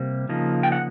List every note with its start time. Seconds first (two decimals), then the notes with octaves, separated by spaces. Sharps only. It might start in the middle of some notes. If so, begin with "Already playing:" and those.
Already playing: C3 G3 A#3
0.29 C#3 F3 A#3 D#4
0.63 G5
0.72 F#5